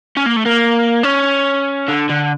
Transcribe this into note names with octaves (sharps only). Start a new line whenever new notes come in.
C#4
A#3
A3
A#3
C#4
D3
D3